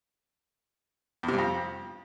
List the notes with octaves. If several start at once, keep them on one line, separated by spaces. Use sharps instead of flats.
E2
C3
G2
F2